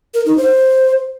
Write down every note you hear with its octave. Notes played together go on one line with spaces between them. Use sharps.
A#4
D#4
C5